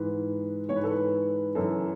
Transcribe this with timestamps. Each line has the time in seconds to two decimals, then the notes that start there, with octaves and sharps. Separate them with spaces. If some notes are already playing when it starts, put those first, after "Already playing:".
Already playing: G#2 E3 B4
0.68 G#2 E3 C#5
0.76 B4
0.84 A4
0.91 B4
1.55 F#2 E3 A4